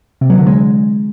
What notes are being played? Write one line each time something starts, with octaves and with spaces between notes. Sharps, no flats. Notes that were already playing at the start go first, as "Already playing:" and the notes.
C3
F#3
D3
G#3